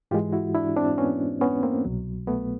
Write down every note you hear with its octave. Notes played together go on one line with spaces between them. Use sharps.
G#2 E3 G#3 F4 G4
E4 F#4
D4 E4
C4 D4
B3 C#4
B3 C#4
A#3 C4
C2 B2 F#3
A3 B3